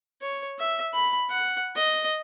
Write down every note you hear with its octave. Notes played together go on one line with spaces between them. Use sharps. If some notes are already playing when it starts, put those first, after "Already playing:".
C#5
E5
B5
F#5
D#5